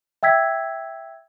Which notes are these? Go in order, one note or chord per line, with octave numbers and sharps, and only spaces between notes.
E5 G5 E6 G#6 B6